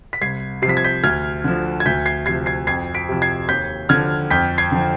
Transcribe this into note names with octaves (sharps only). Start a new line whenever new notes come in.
B6
C2 G#6 C7
C3 F3 B6 C7
G#6
G6 B6
D2 F6 G#6
D3 F3
G#6
D2 G6 B6
G#6 C7
C3 F3 G#6 C7
G#6 C7
F2 G#6 C7
B6 D7
C3 F3
G#6 C7
D#2 G6 B6
D3 F3 F6 G#6
F2 G6 B6
G#6 C7
D3 F3